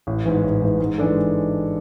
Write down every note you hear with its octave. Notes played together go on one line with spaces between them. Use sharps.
A1
G#2 E3
A1
G#2 E3
G#2
E3 G#3 D4 A4